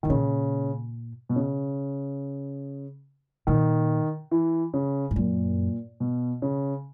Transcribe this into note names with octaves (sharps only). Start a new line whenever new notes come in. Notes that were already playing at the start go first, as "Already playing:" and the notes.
G#2 D#3
A#2 C#3
B2
C#3
A#2 D#3
E3
C#3
G#2
F#2 A#2
B2
C#3